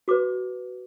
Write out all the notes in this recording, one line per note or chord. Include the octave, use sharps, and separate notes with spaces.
F#4 B4 D6